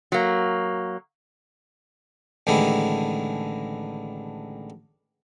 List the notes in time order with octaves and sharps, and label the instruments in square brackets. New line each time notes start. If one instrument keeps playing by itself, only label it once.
[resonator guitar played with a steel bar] F#3 A#3
[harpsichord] A1 D3 D#3 G#3 E4